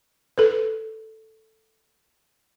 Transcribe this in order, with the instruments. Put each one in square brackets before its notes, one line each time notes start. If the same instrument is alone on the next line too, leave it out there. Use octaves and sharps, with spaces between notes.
[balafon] A4 B4